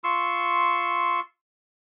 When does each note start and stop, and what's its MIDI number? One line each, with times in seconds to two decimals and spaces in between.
0.04 1.20 65
0.04 1.20 84
0.04 1.20 85
0.04 1.20 88